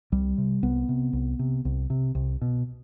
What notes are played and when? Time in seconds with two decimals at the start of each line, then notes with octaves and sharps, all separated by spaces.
0.12 C2 G3
0.38 C3
0.63 C2 B3
0.89 C3
1.13 C2
1.39 C3
1.65 C2
1.90 C3
2.15 C2
2.41 B2